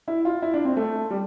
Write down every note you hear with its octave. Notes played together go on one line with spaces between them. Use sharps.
E4
F4
E4
D4
C4
A3
G3